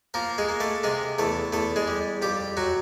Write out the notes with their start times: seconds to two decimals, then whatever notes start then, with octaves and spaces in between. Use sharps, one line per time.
0.14 F3 A#3 A#4
0.38 G#3 G#4
0.49 A#3
0.60 A3 A4
0.83 C3 G#3 G#4
1.18 E2 A3 A4
1.52 E2 A3 A4
1.76 G#3 G#4
1.88 G3
2.22 F2 G3 G4
2.57 F#3 F#4